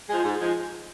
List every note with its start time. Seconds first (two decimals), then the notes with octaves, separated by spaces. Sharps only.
0.09 F3 G#3
0.24 G#2
0.40 F3 G#3